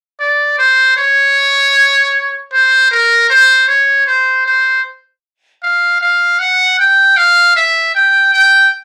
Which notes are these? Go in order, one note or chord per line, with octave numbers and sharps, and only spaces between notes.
D5
C5
C#5
C5
A#4
C5
C#5
C5
C5
F5
F5
F#5
G5
F5
E5
G5
G5